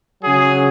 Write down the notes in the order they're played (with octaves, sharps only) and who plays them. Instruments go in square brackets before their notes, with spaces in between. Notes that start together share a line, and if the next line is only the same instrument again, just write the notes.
[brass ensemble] C#3 F#3 G#4